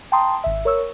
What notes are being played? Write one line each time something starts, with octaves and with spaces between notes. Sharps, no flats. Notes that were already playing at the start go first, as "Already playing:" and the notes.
G5 A5 A#5 C6 D#6
G#1 E5
A#4 C#5 C#6 E6